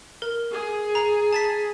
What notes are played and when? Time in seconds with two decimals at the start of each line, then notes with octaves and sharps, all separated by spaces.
0.22 A#4
0.52 G#4
0.95 A#5
1.33 A5 A6 B6